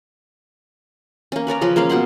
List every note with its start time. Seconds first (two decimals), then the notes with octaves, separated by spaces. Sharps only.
1.32 A#3 C#4
1.47 B4 C#5 D5 A#5
1.61 C#3 F3 C#4 B4
1.76 G#3 A#3 C#4 F5
1.89 B2 A#3 F#5 C6